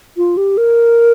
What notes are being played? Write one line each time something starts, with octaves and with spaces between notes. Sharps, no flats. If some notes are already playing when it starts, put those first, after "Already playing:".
F4
G4
A#4